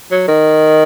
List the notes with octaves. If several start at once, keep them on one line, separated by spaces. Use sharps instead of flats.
F#3
D#3